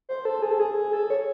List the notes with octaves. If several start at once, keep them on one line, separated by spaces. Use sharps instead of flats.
C5
A4
G#4
A4
G#4
A4
C#5